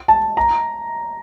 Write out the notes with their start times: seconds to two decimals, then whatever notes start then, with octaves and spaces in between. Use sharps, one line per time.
0.08 A5
0.37 A#5